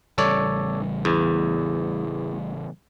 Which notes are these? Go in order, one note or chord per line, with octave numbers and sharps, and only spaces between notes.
A1 C#3 G3 A4 C#5 D5
E2